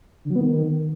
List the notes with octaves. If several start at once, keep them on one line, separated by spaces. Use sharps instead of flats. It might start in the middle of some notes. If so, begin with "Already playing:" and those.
D3
F#3
B3
D#3